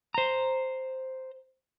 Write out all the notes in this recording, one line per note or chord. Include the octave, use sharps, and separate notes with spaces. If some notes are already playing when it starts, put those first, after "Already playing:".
C5 A#5